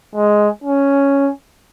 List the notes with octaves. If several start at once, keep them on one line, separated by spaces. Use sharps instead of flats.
G#3
C#4